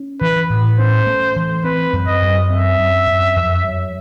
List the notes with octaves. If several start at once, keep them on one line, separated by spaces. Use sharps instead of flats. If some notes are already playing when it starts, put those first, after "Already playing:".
Already playing: C#4
E3 B4
A2
C#4 C5
A3
E3
C4 B4
F#2
D#5
F#2
C4 E5
F#2
F#2
F2
F#3